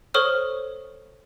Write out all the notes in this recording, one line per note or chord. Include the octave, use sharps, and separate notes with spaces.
A4 C5 C#5 C#6 D#6 F6